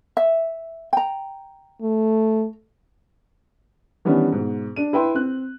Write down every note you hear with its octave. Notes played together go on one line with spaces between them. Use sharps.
E5
G5 A#5
A3
D#3 E3 G3 B3 C#4 D4
G#2 B2
D4 D#7
E4 B4 G5 C6
C4 F#6